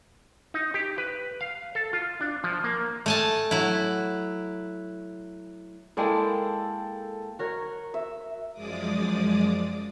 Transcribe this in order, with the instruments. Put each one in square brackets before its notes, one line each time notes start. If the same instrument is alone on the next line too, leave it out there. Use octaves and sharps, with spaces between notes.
[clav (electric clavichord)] D#4
G4
B4
F5
A4
F4
D4
F3
A#3
[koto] A3 G#5 A5
F#3 E4
[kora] G#3 A#3 E4 [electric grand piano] A4 G5 A5
[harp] F#4 A#4 C#5
[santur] E5
[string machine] F#2 F3 G#3 D5 D6 D#6